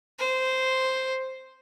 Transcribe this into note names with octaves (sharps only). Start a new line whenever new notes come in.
C5